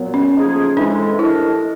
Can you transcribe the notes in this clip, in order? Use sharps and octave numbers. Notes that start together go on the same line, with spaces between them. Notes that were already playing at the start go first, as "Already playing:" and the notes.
Already playing: A#2 F#3 B3
C#4
A2 F3 A#3 D#4 G#4
A2 E3 G#3 C4 D4
A3 D4 E4 G4 A#4 D#5